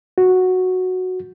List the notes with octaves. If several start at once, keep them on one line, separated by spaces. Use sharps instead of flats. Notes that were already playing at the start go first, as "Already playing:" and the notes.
F#4